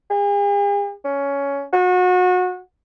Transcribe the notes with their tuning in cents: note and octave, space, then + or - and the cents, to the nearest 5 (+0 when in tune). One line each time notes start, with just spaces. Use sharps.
G#4 -45
C#4 +15
F#4 -30